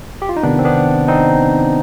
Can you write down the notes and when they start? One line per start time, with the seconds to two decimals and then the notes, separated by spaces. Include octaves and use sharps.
0.22 G4
0.29 F4
0.37 D#4
0.43 C3 D#3 B3 D4
0.59 C4
0.65 B3 D4
1.08 C4 D#4